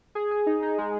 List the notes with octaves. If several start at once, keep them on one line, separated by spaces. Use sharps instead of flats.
G#4
G#4
D#4
D#4
G#3